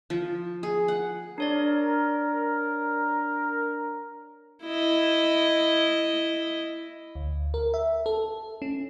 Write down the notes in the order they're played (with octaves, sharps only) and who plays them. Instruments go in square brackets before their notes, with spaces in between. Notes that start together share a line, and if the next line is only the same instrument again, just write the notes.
[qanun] F3
G#4
F#5
[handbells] D4 C#5 D5 [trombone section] A#4
[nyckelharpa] E4 D#5
[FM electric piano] D2
A#4
E5
A4
C#4